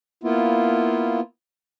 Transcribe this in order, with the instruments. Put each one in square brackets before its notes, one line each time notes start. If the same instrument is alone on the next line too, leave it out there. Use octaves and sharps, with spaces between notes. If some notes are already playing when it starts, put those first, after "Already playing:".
[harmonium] A#3 B3 E4 F4